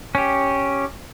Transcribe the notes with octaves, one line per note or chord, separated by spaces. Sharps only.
C#4 G4